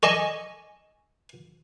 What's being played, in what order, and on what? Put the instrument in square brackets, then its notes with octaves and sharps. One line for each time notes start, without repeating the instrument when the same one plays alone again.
[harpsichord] A4 D5 A5 [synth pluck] D#5 G#5 C#6